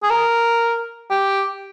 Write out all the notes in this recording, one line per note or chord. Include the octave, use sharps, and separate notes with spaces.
G#4
A#4
G4